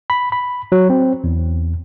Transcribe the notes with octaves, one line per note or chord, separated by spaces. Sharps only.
B5
B5
F#3
C4
E2